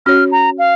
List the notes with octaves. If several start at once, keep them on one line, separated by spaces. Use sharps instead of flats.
C#4 F#4 C#5 F6
A#5
F5